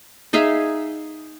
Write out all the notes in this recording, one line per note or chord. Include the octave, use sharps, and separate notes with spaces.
D#4 G#4 E5 F5